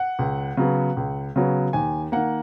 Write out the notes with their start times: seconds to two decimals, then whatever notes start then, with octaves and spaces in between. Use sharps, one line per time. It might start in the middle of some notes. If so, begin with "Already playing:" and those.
Already playing: F#5
0.19 C#2
0.57 C#3 F#3 B3
0.97 C#2
1.36 C#3 F#3 B3
1.73 D#2 G#5
2.12 D#3 A#3 F#5